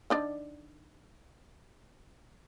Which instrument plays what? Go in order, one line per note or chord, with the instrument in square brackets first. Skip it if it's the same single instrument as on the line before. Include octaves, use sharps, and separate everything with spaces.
[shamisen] D#3 D4 D5